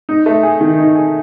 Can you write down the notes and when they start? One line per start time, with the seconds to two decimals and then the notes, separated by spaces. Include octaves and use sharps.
0.09 D#4
0.26 A3
0.43 G#4
0.61 D#3
0.78 D#4
0.95 G#4